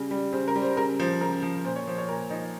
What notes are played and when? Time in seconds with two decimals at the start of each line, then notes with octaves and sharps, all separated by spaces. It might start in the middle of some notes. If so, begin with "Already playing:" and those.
Already playing: C#3 G3
0.11 G3
0.32 C#3 C5
0.48 A#4
0.56 G3
0.62 C5
0.76 C#3 A#4
0.99 F3 C5
1.21 C#3 A#4
1.43 F3
1.64 A#2 C5
1.76 C#5
1.87 F3 C5
1.98 C#5
2.09 A#2 A#4
2.30 F3 D#4